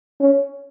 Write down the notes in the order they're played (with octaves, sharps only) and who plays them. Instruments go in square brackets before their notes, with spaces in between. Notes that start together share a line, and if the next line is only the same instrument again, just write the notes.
[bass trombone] C#4